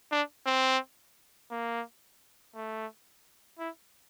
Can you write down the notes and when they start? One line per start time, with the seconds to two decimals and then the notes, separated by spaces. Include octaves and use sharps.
0.12 D4
0.46 C4
1.51 A#3
2.55 A3
3.59 E4